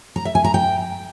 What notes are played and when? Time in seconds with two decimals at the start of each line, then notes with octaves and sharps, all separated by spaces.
0.16 A#5
0.25 E5
0.35 G#5
0.44 A#5
0.54 G5